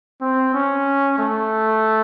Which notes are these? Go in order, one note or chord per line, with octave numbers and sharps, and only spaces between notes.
C4
C#4
A3